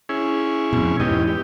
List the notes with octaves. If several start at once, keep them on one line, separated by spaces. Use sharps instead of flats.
C#4 E4 G#4
F2 B2
E2 G#2 E3 G4 D#5
G4